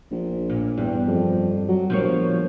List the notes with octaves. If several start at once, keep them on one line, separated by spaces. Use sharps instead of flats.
A#1
A#2
E2 G2
F2
F#3
G1 F3 A#3 C#5